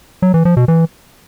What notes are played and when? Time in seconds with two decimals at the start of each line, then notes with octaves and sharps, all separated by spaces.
0.22 F#3
0.34 E3
0.45 F3
0.57 B2
0.68 E3